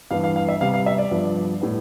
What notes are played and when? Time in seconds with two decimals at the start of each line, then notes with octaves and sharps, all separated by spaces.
0.11 G2 E3 B3 F5
0.24 F5
0.36 F5
0.49 E5
0.61 C3 G3 B3 F5
0.74 F5
0.86 E5
0.98 D5
1.11 G2 F3 B3
1.61 A2 G3 B3